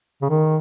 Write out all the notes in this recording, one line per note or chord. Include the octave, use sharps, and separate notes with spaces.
C#3
D#3